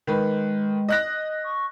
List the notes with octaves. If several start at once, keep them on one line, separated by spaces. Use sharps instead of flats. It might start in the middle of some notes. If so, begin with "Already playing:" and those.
D#3 G#3 B4
D#5 F#6 A#6
C#6